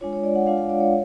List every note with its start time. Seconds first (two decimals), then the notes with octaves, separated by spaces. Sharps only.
0.01 G#3 D4 F4 C#5
0.13 C#5
0.23 D5
0.35 F#5
0.47 G#3 D4 F4 F5
0.58 F5
0.69 D5
0.80 C#5